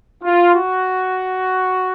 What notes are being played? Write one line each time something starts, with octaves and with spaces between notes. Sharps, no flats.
F4
F#4